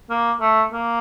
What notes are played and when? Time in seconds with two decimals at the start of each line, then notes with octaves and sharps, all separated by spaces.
0.10 A#3
0.40 A3
0.72 A#3